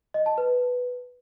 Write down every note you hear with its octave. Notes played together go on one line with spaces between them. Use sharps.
D#5
A5
B4